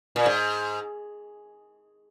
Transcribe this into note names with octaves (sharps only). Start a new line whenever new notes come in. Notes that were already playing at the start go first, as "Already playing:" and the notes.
A#2
G#2